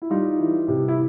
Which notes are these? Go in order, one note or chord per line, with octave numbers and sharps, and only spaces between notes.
E4
G3 D#4 F4
E3
C3
E4